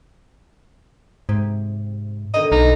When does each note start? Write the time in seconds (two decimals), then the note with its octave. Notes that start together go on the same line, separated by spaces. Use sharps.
1.29 G#2 C3
2.34 B2 D3 D#3 D#5
2.52 B1 D#4